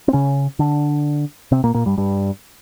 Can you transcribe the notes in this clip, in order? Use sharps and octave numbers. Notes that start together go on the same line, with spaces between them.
C4
C#3 C#4
D3 D4
C3 C4
A#2 A#3
A#2 A#3
G2 G3
G2 G3